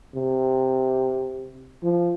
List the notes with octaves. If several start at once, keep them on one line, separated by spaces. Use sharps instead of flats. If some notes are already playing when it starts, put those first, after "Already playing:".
C3
F3